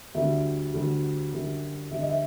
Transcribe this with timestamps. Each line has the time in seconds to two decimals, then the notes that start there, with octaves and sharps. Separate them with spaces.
0.14 D2 D3 G3 E5
0.73 D2 D3 G3
1.32 F#2 D3 G3
1.91 F#2 D3 G3 E5
2.01 D#5
2.09 E5